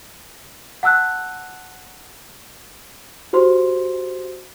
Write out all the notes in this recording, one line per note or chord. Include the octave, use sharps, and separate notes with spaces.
F#5 A5 E6 F#6
F#4 G4 C5 C6